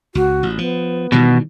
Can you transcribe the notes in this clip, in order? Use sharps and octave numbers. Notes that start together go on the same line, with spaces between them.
C#2 F#4
A1
F3 B3
B2 D#3 E3 G3